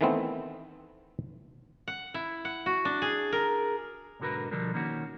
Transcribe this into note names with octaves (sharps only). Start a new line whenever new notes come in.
D#3 E3 A3 B3 C4
F#5
E4
F#5
F#4
D4
G#4
A#4
B1 G#2 D3 F#4 A#4 B4
B2 D3 F3 G3 D4 A#4
D#3 A#3 C#4 F#4